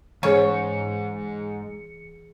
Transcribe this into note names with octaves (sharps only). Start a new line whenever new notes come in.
G#2 E3 C#4 G#4 C#5 C#7